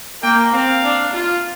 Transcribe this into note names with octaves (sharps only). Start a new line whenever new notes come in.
A#3 G5
C4 F5
D4
F4